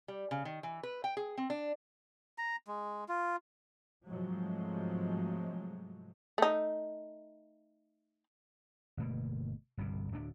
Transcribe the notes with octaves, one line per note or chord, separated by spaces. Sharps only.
G3
C#3
D#3
E3
B4
G5
G#4
C4
D4
A#5
G#3
F4
G#2 C3 F3 F#3 G#3 A3
A3 D#4
G1 B2 A3 A#3
G1 C2 G2 B2
D1 D2 G3 D4